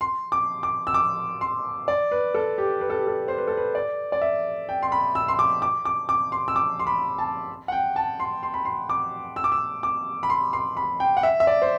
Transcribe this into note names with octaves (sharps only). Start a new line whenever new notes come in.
C6
D6
D6
E6
D6
C6
D5
B4
A4
G4
B4
A4
G4
A4
C5
B4
A4
B4
D5
D5
E5
G5
C6
B5
E6
C6
D6
D6
D6
D6
C6
E6
D6
C6
B5
A5
F#5
G5
A5
C6
C6
B5
C6
D6
E6
D6
E6
D6
B5
C6
C6
B5
G5
F#5
E5
E5
D5
C5